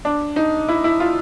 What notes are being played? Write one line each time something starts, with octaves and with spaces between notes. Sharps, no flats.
D4
D#4
E4
E4
F4